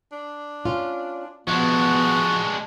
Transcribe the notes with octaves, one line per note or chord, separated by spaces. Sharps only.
D4
C#4 F4
F3 G#3 B3 D4 F#4